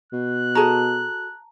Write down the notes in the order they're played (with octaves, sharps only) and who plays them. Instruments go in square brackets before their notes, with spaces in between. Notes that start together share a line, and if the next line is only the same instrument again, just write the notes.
[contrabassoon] B2 [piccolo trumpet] F#6
[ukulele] F#4 G#4 A4 [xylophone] A5 A#5